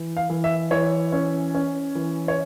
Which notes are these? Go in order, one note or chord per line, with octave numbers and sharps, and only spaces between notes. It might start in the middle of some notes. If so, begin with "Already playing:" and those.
Already playing: E3
F5
E3
E5
E3 C#5
C#4
C#4
E3
C#5